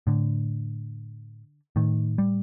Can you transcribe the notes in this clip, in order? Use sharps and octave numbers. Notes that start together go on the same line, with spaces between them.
A2 D3
A2 D#3
G3